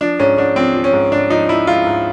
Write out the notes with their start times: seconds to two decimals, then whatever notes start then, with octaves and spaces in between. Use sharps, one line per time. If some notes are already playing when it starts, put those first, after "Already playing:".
0.01 F3 D4
0.20 G#2 C#4
0.38 G#2 D4
0.56 F3 C4
0.74 F3
0.84 C#4
0.93 G#2
1.12 G#2 D4
1.30 F3 D#4
1.49 F3 E4
1.67 G#2 F4
1.87 G#2